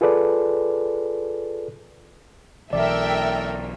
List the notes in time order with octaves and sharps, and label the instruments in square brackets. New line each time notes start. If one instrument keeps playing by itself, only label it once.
[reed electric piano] F4 G#4 A4 B4 D5
[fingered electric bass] B1 E3 [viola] A4 A#4 [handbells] D5 [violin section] E5 G5